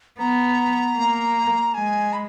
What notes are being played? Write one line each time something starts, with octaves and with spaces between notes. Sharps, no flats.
B3 A#5
A#3
G#3 G#5
B5